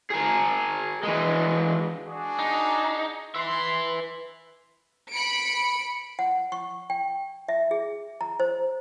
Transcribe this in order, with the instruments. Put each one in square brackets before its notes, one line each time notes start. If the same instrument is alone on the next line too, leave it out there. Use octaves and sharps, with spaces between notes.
[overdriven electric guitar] G#4 A#4
E3 G#3
[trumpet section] D4 F#4 G#4
[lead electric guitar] D#4
[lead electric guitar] B4 E5 [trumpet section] C6
[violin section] B5 C#7 D7
[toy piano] F#5
C#6
G5
E5
G#4
A#5
C5